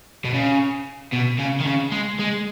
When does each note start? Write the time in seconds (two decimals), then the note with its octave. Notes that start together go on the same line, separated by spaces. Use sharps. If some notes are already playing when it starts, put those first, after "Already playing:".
0.25 B2
0.34 C#3
1.13 B2
1.39 C#3
1.60 D#3
1.65 C#3
1.92 G#3
2.19 G#3